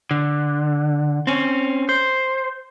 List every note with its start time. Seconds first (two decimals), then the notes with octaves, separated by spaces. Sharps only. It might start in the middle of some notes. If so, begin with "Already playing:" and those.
0.11 D3
1.27 C4 C#4
1.89 C5